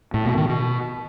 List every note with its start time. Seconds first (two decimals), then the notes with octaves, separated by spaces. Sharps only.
0.14 A2
0.26 B2
0.37 D#3
0.49 B2